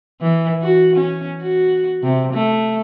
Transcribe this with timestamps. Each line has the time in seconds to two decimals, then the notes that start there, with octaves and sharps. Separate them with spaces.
0.21 E3
0.62 F#4
0.97 C#4
1.42 F#4
2.03 C3
2.34 A3